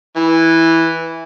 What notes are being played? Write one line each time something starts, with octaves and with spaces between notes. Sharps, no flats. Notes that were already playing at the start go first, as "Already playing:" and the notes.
E3